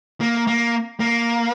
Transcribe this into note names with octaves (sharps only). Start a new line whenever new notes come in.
A#3
A#3
A#3